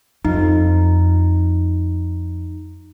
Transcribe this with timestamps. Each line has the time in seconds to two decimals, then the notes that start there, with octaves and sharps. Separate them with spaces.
0.25 F2 D#4